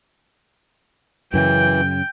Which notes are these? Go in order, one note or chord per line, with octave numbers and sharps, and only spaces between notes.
F#2 C#3 E3 G5